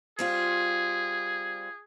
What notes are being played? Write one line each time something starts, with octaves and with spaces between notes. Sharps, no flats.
G3 C4 F4 G#4